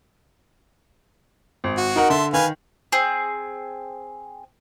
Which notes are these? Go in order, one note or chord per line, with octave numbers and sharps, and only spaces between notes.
G#1
F#4
D#4 A#4 F#5
D3 E5 A5 C6
D#3 B4 F5 G#5
C4 G#4